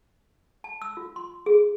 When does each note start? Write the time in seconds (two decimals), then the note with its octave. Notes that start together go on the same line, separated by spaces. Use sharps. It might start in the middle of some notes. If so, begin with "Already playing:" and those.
0.64 A5
0.82 E6
0.97 F4
1.16 C6
1.46 G#4